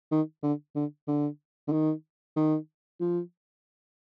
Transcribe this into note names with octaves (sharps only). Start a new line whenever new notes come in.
D#3
D3
D3
D3
D3
D#3
D#3
F3